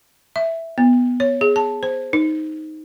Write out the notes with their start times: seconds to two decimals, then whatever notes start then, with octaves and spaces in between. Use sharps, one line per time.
0.36 E5
0.78 B3
1.20 C#5
1.41 G#4
1.56 A5
1.83 C5
2.13 D#4